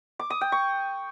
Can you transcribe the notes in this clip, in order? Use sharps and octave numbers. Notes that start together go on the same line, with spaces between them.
D6
D#6
G5
C#6